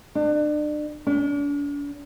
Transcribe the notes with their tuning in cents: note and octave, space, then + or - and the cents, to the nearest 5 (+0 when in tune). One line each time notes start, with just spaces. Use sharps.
D4 +35
D4 -40